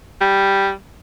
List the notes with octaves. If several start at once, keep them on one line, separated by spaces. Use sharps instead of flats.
G3